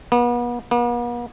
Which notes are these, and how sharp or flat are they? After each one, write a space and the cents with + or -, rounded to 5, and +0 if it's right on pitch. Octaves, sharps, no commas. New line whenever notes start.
B3 -35
B3 -45